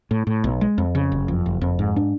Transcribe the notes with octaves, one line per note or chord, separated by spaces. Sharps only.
A2
A2
B1
G#3
F2
C#3
F#1
F2
F#1
F2
G#2
D4